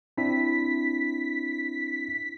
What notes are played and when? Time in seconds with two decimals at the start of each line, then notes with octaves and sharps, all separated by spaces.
0.17 C4 D4 E4 B6